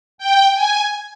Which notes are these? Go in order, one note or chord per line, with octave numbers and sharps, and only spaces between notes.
G5
G#5